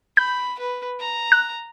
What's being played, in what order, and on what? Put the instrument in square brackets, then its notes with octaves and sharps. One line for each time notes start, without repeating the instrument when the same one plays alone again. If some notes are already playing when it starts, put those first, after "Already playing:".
[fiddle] B5 [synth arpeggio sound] G6
[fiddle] B4
A#5
[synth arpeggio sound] F#6